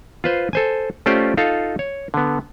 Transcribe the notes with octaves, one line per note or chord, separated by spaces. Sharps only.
F4 B4 C5
A4 C5 G#5
A3 C#4 F4 G4 C5 D5
D#4 F4 A4 F5
C#5
D3 B3